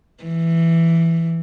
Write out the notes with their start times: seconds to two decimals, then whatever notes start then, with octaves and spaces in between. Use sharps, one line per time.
0.24 E3